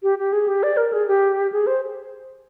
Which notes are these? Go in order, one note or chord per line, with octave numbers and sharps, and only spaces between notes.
G4
G4
G#4
G4
D5
A#4
G#4
G4
G#4
C5